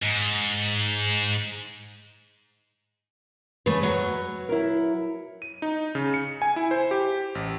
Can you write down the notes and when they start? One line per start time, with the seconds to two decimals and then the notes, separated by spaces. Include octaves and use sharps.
0.02 G#2
3.66 C#3 A3 B4
3.83 F#3 C#5
4.49 E4 A#4
5.42 D#7
5.62 D#4
5.95 C#3
6.14 C#7
6.42 G#5
6.56 E4
6.71 C5
6.91 G4
7.35 A1